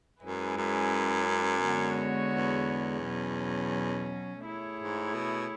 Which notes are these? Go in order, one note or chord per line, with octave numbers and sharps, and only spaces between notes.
F#2 G#3 C#4 E4 G#4 B4
F#2
D3 G#3 B3 F#4 C#5
E2
B2 F#3 C#4
A3 E4 G#4 C#5
G#2
B2